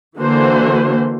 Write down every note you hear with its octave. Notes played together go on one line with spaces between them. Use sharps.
D3 E3 A#3 F#4 C5